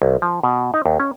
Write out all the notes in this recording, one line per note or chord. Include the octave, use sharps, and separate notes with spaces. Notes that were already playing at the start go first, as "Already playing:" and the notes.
C2
F3
B2
D#4
D#2
C#4